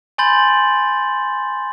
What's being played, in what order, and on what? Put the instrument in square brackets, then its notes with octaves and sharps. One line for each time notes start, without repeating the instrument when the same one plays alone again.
[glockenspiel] G#5 B5 C6 G6 A6 F#7